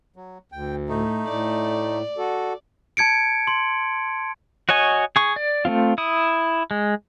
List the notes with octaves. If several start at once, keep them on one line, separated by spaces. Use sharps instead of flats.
F#3
D2 G5
A2 A3 D#4
A2 D5
F#4 A4
A5 G#6 C#7 D7
C6
F#4 C#5 D#5 G#5
G#4 C#6
D5
A3 A#3 C4 F4
E4 D#6
G#3